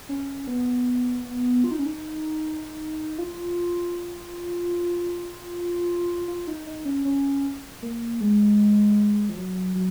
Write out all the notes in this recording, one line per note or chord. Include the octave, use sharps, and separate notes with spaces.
C#4
B3
F4
D#4
C#4
D#4
F4
F4
D#4
D#4
C#4
C#4
A#3
G#3
F3
F#3
F#3